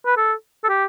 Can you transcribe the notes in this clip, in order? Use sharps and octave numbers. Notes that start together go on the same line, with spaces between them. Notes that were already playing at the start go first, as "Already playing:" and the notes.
B4
A4
A4
G4